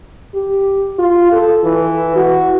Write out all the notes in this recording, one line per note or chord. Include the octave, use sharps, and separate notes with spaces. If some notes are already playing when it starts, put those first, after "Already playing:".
G4
F4
A4
E3
F#4